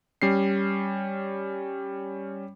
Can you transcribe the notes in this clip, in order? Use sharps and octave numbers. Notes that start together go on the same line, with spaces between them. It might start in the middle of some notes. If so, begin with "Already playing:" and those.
G3 C#4 C7